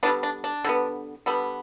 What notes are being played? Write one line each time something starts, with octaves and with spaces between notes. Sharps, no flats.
D3 G3 B3 D4
D4
D4
D3 G3 B3
D3 G3 B3